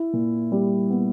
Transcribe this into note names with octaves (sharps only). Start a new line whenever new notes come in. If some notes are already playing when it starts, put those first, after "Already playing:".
Already playing: E4
A#2
G3
B3